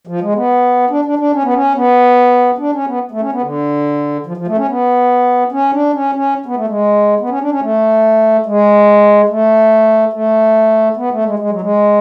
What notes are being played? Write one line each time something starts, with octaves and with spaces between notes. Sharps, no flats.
F3
G#3
B3
D4
D4
D4
C#4
B3
C#4
B3
D4
C#4
B3
A3
C#4
B3
D3
F3
F3
A3
C#4
B3
C#4
D4
C#4
C#4
B3
A3
G#3
B3
C#4
D4
C#4
A3
G#3
A3
A3
B3
A3
G#3
G#3
F#3
G#3